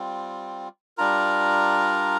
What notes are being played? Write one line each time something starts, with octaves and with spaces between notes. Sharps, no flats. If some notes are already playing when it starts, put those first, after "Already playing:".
Already playing: G3 C4 F4
G3 D4 F4 A#4 A#5